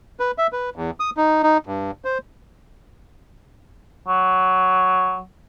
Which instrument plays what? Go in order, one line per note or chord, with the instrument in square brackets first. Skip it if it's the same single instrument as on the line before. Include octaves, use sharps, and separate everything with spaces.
[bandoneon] B4
E5
B4
E2
D#6
D#4
D#4
G2
C5
[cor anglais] F#3